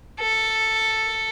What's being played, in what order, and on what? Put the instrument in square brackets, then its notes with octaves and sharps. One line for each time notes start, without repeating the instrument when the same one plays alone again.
[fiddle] A4